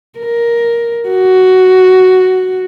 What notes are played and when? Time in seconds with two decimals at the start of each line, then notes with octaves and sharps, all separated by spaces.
0.19 A#4
1.09 F#4